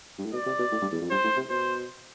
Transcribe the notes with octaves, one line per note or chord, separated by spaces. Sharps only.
G2
A2
B2 D5
C3
B2
A2
G2
E2
F2
G2 C5
A2
C3
B2 C5